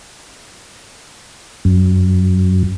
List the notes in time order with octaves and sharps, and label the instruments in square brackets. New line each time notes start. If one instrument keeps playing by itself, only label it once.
[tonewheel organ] F#2